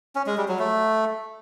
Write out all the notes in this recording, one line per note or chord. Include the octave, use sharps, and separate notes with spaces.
C#4
G#3
G3
F#3
A3